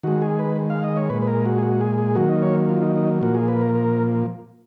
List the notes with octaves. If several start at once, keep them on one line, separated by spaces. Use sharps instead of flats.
D#3 G#3 F#4
G#4
B4
F5
D#5
C#5
A#2 G#3 B4
B4
A#4
F#4
G#4
F#4
G#4
G#4
D#3 F#3 A#3 F#4
D#4
C#5
F4
D#4
D#4
A#2 F3 A#3 F#4
G#4
B4
A#4
A#4